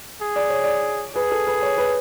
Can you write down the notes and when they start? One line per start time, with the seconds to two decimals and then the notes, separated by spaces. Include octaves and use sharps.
0.21 G#4
0.36 D5
0.50 C#5
0.64 D5
1.15 G#4 B4
1.32 A4
1.47 B4
1.62 C#5
1.78 B4